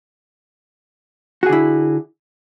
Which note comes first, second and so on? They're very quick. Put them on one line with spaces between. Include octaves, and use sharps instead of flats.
F#4 G#4 D3 E4